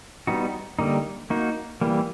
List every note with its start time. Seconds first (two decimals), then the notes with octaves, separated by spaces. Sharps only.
0.27 G3 B3 D#4 F#4
0.79 D3 G3 A#3 D#4
1.30 A#3 D#4 F#4
1.81 E3 G3 A#3